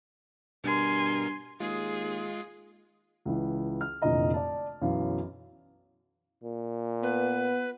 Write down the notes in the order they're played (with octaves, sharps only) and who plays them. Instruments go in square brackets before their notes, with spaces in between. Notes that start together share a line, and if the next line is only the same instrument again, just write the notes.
[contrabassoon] G2 [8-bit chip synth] B2 A#4 [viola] G#5 C6
[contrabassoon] D#2 [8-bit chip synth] G#3 F4 [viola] G#4
[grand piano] C#2 E3
F6
F1 A#2 D3 E3 D#5 A#5
D5 A5
B1 F#2 E3 F5
[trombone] A#2
[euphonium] B3 [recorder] B4